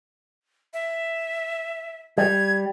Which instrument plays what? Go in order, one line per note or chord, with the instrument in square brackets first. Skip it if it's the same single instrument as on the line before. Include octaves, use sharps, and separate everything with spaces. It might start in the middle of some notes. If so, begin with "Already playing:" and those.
[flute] E5
[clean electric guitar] G3 [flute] G#6